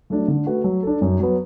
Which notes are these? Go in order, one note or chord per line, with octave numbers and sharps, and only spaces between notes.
F#3 A3 D4
D3
A3 F#4 B4
F#3
D4 A4
F#2
F#3 B3